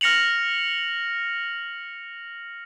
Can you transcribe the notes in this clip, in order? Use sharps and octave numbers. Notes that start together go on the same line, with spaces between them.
F6 A#6 C#7 F7 F#7